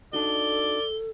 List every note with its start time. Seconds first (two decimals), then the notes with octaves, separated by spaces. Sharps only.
0.13 D4 D#4 F#4 A4 D5 G7